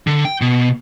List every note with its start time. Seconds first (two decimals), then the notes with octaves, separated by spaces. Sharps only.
0.07 D3
0.25 G5
0.41 B2